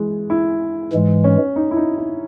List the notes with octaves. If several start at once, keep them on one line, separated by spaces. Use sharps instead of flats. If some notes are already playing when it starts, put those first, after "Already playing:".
Already playing: E3 G#3
E4
G#2 E3 G#3
C#4
D#4
E4
D#4
E4